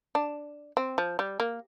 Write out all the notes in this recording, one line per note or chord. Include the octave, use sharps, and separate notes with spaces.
D4
C4
F3
G3
A#3